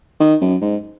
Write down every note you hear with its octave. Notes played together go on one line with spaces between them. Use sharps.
D#3
F#2
G#2